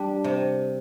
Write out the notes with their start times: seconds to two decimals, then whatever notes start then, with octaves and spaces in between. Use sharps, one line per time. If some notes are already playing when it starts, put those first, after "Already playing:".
Already playing: G3 D4 G4
0.24 C3